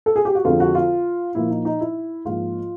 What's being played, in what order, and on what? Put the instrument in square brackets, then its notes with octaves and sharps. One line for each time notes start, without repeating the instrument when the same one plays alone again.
[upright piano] A4
G#4
G4
F#4
F2 D3 F3 G#3 C4 F4
F#4
F4
A#2 F3 A#3 E4
D#4
D#4
E4
G#2 F3 A#3 F4